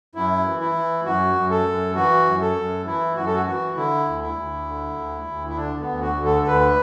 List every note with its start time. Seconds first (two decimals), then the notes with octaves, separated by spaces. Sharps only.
0.15 F#2 E4
0.46 E3
0.60 E4
0.75 E3
1.05 F#2 F#4
1.35 F#2
1.50 A4
1.66 F#2
1.95 E3 F#4
2.25 F#2
2.41 A4
2.57 F#2
2.86 E3 E4
3.16 F#2 F#4
3.26 A4
3.35 F#4
3.46 E3 F#4
3.76 D3 E4
4.06 D2
4.22 E4
4.36 D2
4.66 D3
4.97 D2
5.27 D2
5.49 E4
5.56 D3 D4
5.79 B3
5.87 D2
6.02 F#4
6.17 D3
6.25 A4
6.42 A4
6.47 D2 B4